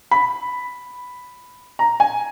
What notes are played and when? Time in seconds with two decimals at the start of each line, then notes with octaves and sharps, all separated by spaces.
0.11 B5
1.79 A#5
2.00 G#5